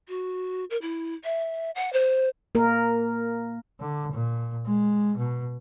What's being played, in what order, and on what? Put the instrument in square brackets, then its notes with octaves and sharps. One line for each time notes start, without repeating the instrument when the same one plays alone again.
[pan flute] F#4
A#4
E4
E5
F#5
C5
[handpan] A#3 A#4
[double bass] D3
A#2
G#3
B2